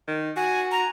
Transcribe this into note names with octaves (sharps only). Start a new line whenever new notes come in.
D#3
F#4 G#5
A#5